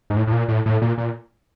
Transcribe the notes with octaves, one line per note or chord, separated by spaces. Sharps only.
G#2
A2
A2
A#2
A2
A2
A#2
A#2